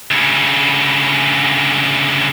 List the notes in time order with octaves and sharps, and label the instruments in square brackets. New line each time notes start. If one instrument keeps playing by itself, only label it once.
[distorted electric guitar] D2 C#3